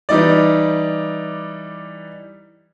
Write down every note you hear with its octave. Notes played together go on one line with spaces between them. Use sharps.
E3 G3 D#4 D5